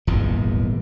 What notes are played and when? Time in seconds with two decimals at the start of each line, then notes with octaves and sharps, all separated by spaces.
0.07 D#1 G#1 E2 B2